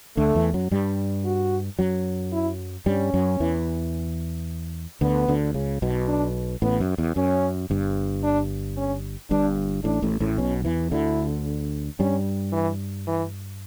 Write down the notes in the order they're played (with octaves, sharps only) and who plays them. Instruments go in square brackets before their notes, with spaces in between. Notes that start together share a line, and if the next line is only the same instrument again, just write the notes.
[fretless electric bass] D2 D3 [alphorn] A3
[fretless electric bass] E2 E3
F#2 F#3
G2 G3
[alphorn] F#4
[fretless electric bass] F#2 F#3
[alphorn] E4
[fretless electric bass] G2 G3 [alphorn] C#4
[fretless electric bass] F#2 F#3
E2 E3
[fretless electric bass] D2 D3 [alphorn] B3
[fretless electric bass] D2 D3
C#2 C#3
B1 B2
[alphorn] D4
[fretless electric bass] A1 A2 [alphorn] B3
[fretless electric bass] F#2
E2
[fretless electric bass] F#2 [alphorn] C#4
[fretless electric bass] G1 G2
[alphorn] D4
C#4
[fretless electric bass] G1 G2 [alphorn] D4
[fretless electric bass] A1 A2 [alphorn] D4
[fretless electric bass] A1 A2
A1 A2
[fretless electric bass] B1 B2 [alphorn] C#4
[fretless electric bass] E2 E3
[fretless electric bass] D2 D3 [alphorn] E4
[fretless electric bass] G2 G3 [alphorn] C#4
[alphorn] E3
E3